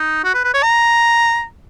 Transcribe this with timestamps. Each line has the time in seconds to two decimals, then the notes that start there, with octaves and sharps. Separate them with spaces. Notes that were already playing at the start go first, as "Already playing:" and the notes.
Already playing: D#4
0.24 F#4
0.34 B4
0.44 B4
0.54 C#5
0.63 A#5